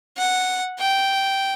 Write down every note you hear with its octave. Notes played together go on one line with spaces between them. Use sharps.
F#5
G5